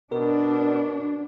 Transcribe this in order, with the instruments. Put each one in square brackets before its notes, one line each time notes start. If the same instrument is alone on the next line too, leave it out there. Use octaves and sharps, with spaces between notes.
[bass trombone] B2 [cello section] D4 [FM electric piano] A#4